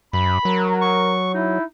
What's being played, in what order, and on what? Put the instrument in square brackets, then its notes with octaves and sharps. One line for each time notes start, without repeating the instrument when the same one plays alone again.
[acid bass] F#2 [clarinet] B5
[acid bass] F#3 [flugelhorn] A#4
[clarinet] C#6
[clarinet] D#4 [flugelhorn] E4